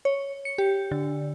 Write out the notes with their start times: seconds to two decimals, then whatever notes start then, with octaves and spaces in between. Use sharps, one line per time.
0.05 C#5
0.45 C#7
0.58 G4
0.91 D3